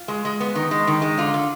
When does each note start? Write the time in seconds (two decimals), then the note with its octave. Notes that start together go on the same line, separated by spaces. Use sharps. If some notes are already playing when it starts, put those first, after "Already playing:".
Already playing: F4
0.08 G#3
0.25 G#3
0.40 B3
0.55 D#3
0.71 G#3
0.87 D#3
1.02 G#3
1.17 D3 F4
1.34 D3